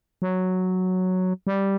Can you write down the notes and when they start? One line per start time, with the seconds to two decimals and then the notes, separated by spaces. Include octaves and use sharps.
0.22 F#3
1.47 G3